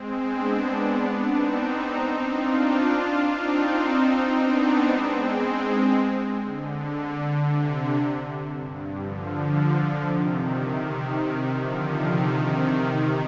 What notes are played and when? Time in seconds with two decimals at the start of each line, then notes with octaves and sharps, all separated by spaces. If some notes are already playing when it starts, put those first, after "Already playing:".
Already playing: G#3 C4
0.23 B3 D4
1.26 C4 D#4
2.29 D4 F4
3.33 C4 D#4
4.36 B3 D4
4.87 G#3 C4
6.42 D3
7.45 C3
8.48 G2
9.00 D3 F3
10.02 C3 D#3
10.54 C3 D#3
11.57 D3 F3
12.09 C3 D#3